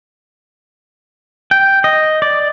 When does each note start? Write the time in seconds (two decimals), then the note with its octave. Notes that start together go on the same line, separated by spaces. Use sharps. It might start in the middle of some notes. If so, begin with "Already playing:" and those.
1.51 G5
1.84 D#5
2.22 D5